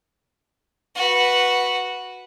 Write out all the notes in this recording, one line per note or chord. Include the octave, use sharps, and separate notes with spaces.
F#4 B4